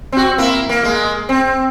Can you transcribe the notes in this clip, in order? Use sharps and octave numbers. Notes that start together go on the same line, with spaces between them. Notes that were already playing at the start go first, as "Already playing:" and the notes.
C4 F#4
A#3 E4
A#3
G#3 A#3
C4